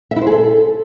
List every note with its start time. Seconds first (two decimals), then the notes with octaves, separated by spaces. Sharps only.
0.11 E5
0.16 E4
0.21 C5
0.27 G#4
0.32 A4